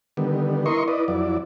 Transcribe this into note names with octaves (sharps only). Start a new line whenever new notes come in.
D3 D#3 G3 B3
E4 A#4 D#5 C6 C#6
E4 B4 D5 D#5
F2 F#3 E4 D5